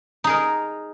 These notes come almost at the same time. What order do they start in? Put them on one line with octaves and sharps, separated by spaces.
D#4 G#4 A#4